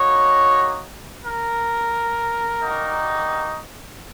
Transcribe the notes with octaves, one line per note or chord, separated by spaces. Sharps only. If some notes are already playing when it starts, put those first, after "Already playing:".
Already playing: A#3 D#4 F#4 C#5
A#4
G3 A#3 D#4 F#4